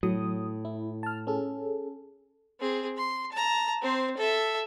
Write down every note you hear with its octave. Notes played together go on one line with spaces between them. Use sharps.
A2 F#3 D#6
E4
A5 F6
C#4 G#4 A4
C4 G#4
C6
A5 A#5
C4 C5
A4 E5